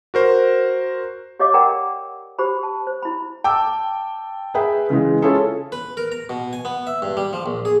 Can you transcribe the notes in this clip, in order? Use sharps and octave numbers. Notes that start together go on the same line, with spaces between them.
F#4 A#4 C5
G4 C#5 D#5 F5 D6
A#4 D5 F#5 G5 A#5
G4 C5 B5
A5
C5
E4 B5
G5 A5 D6 E6
G#4 B4 E5 G5
C#3 E3 G#3
C#4 E4 F4 G#4 A4
B4
A#4
A#5
B2
G#5
B3
E5
G2
G3
F3
A#1
G#4